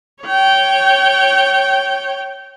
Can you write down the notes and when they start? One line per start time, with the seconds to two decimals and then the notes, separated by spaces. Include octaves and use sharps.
0.22 C#5 G5